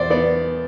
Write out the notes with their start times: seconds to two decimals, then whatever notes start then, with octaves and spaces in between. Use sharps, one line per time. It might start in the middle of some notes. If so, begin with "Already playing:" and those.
Already playing: E2 C5 D5
0.10 B3 D5